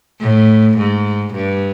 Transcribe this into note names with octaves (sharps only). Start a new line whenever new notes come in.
A2
G#2
G2